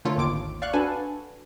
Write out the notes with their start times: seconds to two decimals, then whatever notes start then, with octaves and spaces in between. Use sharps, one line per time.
0.05 D3 A3 F4 A4 A#4 C#5
0.17 G#1 D#2 D6 D7
0.62 D5 F5 C#6 F#6
0.73 D4 F#4 A4 B4 G#5 A5